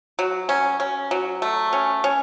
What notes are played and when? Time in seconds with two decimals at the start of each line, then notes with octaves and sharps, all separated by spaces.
0.19 F#3
0.49 C#4
0.80 C#4
1.11 F#3
1.42 A3
1.73 C#4
2.04 C#4